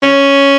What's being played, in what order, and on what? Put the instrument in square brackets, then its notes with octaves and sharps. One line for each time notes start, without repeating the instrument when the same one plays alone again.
[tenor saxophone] C#4